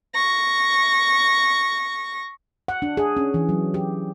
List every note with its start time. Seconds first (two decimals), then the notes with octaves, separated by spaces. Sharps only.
0.15 C#6 A#6
2.68 F#5
2.82 D4
2.97 G#4
3.17 C#4
3.34 E3
3.49 F#3
3.74 G4